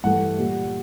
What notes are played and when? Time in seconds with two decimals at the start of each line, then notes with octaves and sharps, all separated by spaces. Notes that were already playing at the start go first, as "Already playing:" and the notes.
0.04 G2 E3 A3 F#5
0.38 A#2 G3